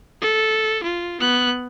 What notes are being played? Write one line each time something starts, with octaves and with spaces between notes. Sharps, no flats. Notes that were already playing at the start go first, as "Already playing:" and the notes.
A4
F4
B3 F#6